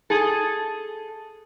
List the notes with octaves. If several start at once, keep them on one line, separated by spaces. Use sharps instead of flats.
G#4 A4